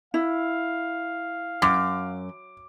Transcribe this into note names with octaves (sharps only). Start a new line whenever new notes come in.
E4 F5
F#2 D6